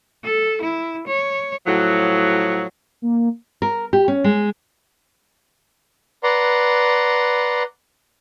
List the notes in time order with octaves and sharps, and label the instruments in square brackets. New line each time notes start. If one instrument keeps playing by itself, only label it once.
[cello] A4
E4
C#5
[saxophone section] A2 F3 F#3
[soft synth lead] A#3
[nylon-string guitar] A#4
G4
C#4
G#3
[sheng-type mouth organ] B4 D5 F#5 A#5 C6